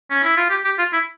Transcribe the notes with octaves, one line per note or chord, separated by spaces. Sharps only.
C#4
E4
F4
G4
G4
F4
E4